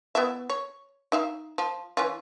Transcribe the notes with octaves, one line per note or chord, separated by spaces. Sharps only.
B3 E4 E5
C#5
D#4 E5 F5
F3
E3 C#4 F4